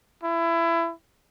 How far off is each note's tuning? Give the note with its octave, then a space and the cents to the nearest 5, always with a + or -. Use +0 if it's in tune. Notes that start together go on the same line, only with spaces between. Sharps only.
E4 +25